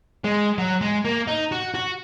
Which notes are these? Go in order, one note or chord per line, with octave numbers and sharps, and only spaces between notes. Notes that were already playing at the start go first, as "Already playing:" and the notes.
G#3
F#3
G#3
A#3
D#4
F#4
F#4